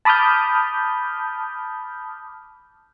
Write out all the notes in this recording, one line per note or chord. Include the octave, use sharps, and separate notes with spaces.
A5 B5 D6 D#6 F6 G6